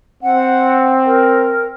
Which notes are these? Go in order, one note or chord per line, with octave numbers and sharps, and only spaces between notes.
C4 F#5
A#4